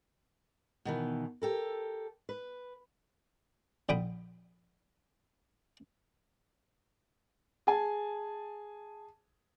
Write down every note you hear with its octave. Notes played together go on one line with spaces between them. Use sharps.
B2 D#3 E3
G4 A4 A#4
B4
A#1 D3 G5 B5 D#6
G#4 G#5 A5